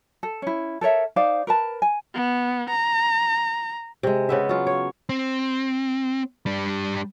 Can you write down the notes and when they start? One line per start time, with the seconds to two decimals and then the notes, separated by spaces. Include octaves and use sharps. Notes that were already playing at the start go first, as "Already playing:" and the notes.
0.23 A4
0.42 C#4 E4
0.81 A4 A#4 C#5 E5
1.16 D#4 C5 D5 F5
1.47 A#4 B4 A5
1.82 G#5
2.15 B3
2.70 A#5
4.03 C3 G#3
4.29 C#3 B3 E5
4.49 F#3 F4
4.67 C#5
5.09 C4
6.46 G3 D4